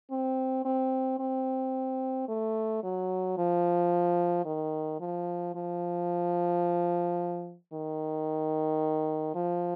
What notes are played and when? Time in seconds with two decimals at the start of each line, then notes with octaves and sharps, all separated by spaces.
0.11 C4
0.65 C4
1.19 C4
2.28 A3
2.83 F#3
3.38 F3
4.45 D#3
5.00 F3
5.55 F3
7.73 D#3
9.35 F3